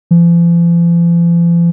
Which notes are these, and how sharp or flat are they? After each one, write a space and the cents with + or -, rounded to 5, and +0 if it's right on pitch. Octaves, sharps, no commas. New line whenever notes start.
F3 -45